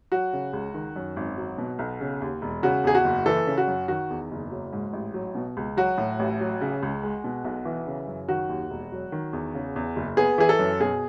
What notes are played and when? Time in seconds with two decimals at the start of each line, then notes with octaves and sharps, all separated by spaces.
0.12 F#3 F#4
0.33 C#3
0.53 C#2
0.74 D#3
0.96 F#2
1.16 G#1
1.37 F#3
1.58 B2
1.79 B1
2.01 C#3
2.21 D#2
2.42 E1
2.63 C#3 F#4
2.84 E2 G#4
2.95 F#4
3.04 F#1
3.26 E3 A4
3.47 C#3
3.58 F#4
3.68 F#2
3.88 D#3 F#4
4.10 E2
4.31 F#1
4.51 F#3
4.73 G#2
4.93 A1
5.14 F#3
5.35 B2
5.57 C#2
5.77 F#3 F#4
5.98 A2
6.19 A1
6.41 F#3
6.61 C#3
6.83 C#2
7.03 G#3
7.24 B2
7.44 B1
7.65 E3
7.87 C#3
8.07 F#2
8.28 D#3 F#4
8.49 D#2
8.71 E1
8.92 F#3
9.12 D#3
9.33 E2
9.54 C#3
9.76 E2
9.96 F#1
10.17 B3 G#4
10.38 E3 G#4
10.49 A4
10.59 F#2
10.80 B2 G#4